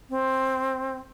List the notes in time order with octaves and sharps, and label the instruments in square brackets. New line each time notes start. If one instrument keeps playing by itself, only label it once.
[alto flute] C4